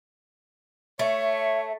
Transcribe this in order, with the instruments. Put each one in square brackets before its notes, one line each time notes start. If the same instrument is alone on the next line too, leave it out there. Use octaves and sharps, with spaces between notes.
[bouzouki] A3 [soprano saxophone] C#5 [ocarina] E5